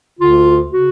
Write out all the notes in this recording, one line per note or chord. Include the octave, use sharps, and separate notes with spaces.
D2 D3 F4
C#3 F#4